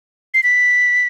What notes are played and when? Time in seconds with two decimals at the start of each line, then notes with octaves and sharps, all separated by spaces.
0.34 C7
0.43 B6